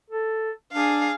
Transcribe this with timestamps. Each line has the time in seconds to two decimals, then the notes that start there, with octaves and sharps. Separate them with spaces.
0.10 A4
0.73 D4 G#4 F5